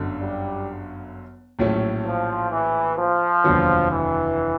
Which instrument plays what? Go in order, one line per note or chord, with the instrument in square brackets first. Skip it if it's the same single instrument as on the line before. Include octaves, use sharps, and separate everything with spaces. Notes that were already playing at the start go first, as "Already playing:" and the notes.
Already playing: [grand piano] G1 F#2 D3 F#3
[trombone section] G3
[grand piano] A#1 A2 F#3 A3 C#4
[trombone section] F3
E3
F3
[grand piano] F1 D#2 D3 F#3 B3
[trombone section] E3